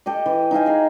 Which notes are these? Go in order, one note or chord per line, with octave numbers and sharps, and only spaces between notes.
G4 A4 D#5
E3
D#4 E5 F5 G#5
G#4 A#5